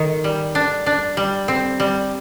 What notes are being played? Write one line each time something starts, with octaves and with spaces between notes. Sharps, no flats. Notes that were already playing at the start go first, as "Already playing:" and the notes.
Already playing: D#3
G3
D4
D4
G3
C4
G3